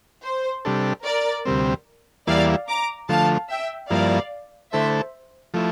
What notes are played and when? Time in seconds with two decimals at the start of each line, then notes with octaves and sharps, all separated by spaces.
0.23 C5
0.65 C3 G3 D4 A4
1.05 A#4 D5
1.45 D2 C3 G3 C4
2.27 E2 E3 G3 A#3 E4 D5 F5
2.68 A#5 D6
3.09 D3 F3 A3 F5 A5
3.50 E5 G5
3.90 G2 F3 A#3 E4 D5 F5
4.72 D3 A3 E4 A4 C5 E5
5.54 F3 A3 E4